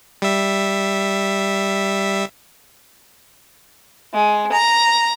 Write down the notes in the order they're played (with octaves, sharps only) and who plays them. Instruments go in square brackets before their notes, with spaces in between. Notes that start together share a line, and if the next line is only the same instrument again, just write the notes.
[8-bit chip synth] G3 E5
[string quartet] G#3
A#5